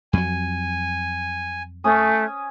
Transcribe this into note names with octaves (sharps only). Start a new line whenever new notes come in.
F2 F#3 G#5
A3 C#4 G#5 D#6